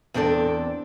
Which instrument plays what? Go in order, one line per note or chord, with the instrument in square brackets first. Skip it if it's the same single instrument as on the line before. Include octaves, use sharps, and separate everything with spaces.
[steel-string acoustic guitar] E2 C4 D4 A4 D5